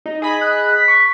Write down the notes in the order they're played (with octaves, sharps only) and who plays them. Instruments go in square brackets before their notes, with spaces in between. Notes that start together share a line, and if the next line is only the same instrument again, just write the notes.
[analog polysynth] D#4
G#4 D#5 B5
[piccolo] F#6
B6
[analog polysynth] C#6